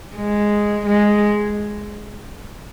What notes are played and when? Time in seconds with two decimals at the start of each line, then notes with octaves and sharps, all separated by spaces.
0.16 G#3
0.86 G#3